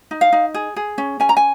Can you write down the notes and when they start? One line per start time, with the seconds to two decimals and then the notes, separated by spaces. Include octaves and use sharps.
0.11 D#4
0.21 F5
0.32 D#4
0.54 G#4
0.76 G#4
0.98 C#4
1.20 C#4 G#5
1.29 A#5
1.37 G#5